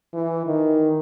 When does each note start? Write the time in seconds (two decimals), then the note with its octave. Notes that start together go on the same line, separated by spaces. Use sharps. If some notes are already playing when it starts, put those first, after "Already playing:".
0.14 E3
0.46 D#3